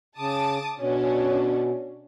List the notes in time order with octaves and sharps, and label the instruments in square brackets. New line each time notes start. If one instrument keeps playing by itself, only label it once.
[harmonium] C#3 [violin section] A5 D6 D#6
[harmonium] B2 [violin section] C#4 D4